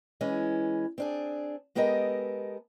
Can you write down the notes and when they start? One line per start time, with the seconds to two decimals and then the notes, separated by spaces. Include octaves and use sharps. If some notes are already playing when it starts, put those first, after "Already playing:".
0.21 E3 G#3 C#4
0.98 C4 D4 G#4
1.75 G#3 B3 G4 A4 A#4 D#5